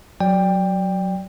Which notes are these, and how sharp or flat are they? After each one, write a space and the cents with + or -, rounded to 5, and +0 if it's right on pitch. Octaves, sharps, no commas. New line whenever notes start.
F#3 +0 D5 +0 G5 +15